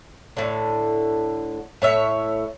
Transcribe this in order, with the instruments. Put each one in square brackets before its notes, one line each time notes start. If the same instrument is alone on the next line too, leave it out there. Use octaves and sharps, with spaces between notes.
[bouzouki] A2 D3
A2 C#5 E5